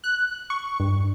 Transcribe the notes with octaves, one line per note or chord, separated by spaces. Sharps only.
F#6
C#6
G2